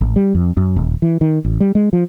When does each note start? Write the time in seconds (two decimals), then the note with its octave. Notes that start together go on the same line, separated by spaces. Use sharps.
0.01 A1
0.16 G3
0.35 F2
0.57 F#2
0.76 D#1
1.02 E3
1.21 D#3
1.45 A1
1.60 G3
1.75 G#3
1.93 F3